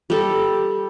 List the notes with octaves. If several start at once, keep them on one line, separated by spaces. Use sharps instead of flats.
G3 A4